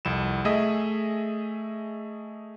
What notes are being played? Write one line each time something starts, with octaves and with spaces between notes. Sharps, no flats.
C2 F2 E7
A3 G#4 D#5 E5 D#6